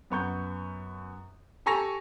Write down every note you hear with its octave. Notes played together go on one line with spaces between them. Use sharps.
F#2 B3 C#6 G6
G4 A4 G#5 C#6 A#6 F7